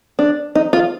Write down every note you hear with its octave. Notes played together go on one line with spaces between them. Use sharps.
D4
D#4
F4